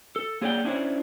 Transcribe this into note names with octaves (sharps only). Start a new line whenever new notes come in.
A4
A#3 G#4 C#5 D5 F#5 G5
C#4 D4 E4 C5 C#5